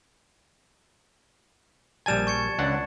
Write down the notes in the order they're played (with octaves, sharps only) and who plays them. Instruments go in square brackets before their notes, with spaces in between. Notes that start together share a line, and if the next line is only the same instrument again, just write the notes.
[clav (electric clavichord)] A#1 G3 G#5 [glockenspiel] A5 A6 E7
[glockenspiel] C#6 G#6 C#7
[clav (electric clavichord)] C#2 D4 F#5